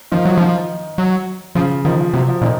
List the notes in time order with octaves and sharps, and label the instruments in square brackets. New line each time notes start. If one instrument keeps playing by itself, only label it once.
[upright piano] D#3 [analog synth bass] F3
[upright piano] F3 [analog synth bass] F#3
[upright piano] D#3 [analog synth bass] F3
[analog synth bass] F#3
[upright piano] C#3 [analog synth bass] F3
[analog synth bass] D#3 [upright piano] F3
[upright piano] F3
[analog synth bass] C3 [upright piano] F#3
[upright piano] F3
[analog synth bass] A#2 [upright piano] D#3